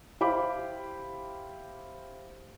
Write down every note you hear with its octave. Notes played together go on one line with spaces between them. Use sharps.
E4 G4 C5 F5 B5 D6